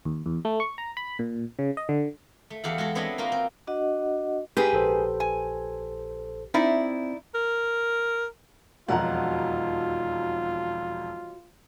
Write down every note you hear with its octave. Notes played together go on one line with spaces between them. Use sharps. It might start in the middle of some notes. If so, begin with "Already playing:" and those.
D#2
E2
A3
C#6
A#5
B5
A#2
C#3
D#5
D3
A3
E2 G4 A4 F5 F#5
G#3 F#4 A4
B3 C4 D4 E4 C#5 D#5
A#3 D#4 F4 F#4
C4
D4 F#4 D#5 F#5
G#2 G4 G#4 B4
A#1 A4 C5
G#5
C4 D#4 E4 D5
A#4
E1 F2 D#3 F#3 F4 F#5 A#5